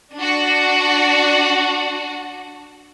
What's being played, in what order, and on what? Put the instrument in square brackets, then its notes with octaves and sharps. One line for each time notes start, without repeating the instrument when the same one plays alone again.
[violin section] D4 F#4